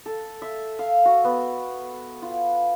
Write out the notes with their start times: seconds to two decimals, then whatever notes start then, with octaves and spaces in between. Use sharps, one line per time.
0.06 A4
0.42 E5
0.79 F5
1.05 F#4
1.24 B3
2.22 F4